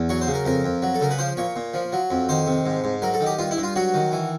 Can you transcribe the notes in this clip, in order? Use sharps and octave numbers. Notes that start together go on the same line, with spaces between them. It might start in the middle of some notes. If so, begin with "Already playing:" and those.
Already playing: E2
F#3 C#5
C5
C#3
A#4
F2 A#4
F2
F#3
A4
C#3 A#4
B4
F3 C5
A#2 C#5
A#2
F3
F#3
F2
D#3 C5
C3
G#2
G#2
F#3 A#4
A4
D#3
G4
G2 F4
E4
G2
F4
F#3 F#4
D#3
E3